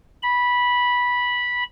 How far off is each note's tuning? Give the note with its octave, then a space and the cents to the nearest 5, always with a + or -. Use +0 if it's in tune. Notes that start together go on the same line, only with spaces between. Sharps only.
B5 -10